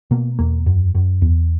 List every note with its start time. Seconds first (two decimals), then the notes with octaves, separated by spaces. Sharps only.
0.11 B2 A#3
0.39 E2 A#3
0.66 F#2
0.95 F#2
1.22 E2